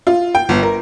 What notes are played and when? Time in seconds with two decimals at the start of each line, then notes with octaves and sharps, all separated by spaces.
0.07 F4
0.35 G5
0.49 G1
0.63 A#4